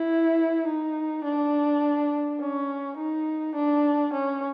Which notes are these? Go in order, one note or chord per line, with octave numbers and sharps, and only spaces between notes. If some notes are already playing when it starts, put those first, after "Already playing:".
Already playing: E4
D#4
D4
C#4
D#4
D4
C#4